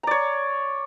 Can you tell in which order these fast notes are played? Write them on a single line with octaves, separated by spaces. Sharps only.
A#5 D5 C#5